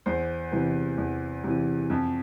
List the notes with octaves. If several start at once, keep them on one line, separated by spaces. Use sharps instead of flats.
E2 C5
C3 E3 B4
E2
C3 E3
F2